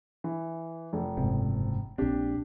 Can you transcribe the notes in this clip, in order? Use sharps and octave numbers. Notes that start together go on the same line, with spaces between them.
E3
F1
F#1 G#2 C3
A#1 C4 D4 G4